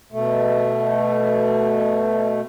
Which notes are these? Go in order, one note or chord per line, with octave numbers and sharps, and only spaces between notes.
B2 A3